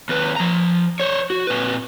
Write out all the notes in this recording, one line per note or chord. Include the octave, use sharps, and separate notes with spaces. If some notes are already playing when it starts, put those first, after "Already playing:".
D#2 B4
F3 A#5
C5 C#5
F#4
A#2 B4